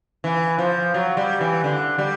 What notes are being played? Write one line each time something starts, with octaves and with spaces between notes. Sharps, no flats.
E3
F3
F#3
G3
E3
D3
G3